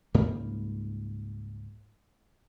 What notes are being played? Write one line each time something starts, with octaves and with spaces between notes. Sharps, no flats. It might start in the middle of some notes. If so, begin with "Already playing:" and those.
C#2 G#2 G3 A#3